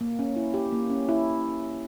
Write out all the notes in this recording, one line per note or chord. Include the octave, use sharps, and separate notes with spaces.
A#3
C#4
E4
G4
A#3
C#4
E4